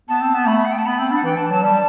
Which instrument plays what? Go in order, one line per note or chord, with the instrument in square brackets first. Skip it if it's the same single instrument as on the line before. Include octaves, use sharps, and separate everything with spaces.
[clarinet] B3 [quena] A5
[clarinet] C4
B3
[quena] A5
[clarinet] A3 [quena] B5
[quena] E5
F#5
G5
A5
[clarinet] B3 [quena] B5
[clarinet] C4
[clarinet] D4 [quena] F#5
[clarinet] E3 [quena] G5
[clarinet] E3 [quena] A5
[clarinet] F#3 [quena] A5
[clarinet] G3 [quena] A5